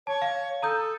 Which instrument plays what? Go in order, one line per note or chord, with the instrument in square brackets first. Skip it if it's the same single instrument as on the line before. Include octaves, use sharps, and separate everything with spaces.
[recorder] C#5 [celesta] A5
[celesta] F5
[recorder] A4 [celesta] A#5 D#6 G6